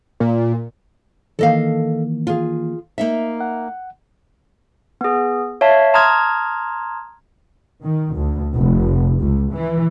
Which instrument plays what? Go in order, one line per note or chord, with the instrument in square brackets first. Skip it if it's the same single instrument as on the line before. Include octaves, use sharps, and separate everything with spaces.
[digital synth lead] A#2
[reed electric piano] D#3 E3 A#3 [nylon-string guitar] A4 D#5 F5
[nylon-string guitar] F4 G#4
A#3 D#4 E5
[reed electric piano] F#5
[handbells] B3 G#4
C#5 E5 F5 A5
A5 A#5 C6 D#6 F6 G#6
[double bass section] D#3
D2
F1
C#2
E3